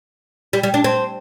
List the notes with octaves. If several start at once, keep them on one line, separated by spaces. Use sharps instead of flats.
G3
G3
D4
C4